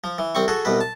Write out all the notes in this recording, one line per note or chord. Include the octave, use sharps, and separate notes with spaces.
F3
E3
C2 C4 C#6
F#4 G#4 A4
C2 B2 B4
A5